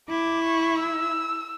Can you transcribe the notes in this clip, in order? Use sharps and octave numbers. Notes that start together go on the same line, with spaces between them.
E4 D6
C#6
E6